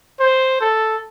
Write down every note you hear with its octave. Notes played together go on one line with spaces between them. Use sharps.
C5
A4